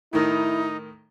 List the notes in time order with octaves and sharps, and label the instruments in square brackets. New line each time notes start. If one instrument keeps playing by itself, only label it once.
[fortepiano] A2 D#3 [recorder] D#4 [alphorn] E4